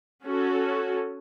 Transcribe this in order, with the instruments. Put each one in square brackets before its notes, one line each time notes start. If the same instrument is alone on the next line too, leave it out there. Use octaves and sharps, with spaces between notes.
[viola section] C#4 F#4 A4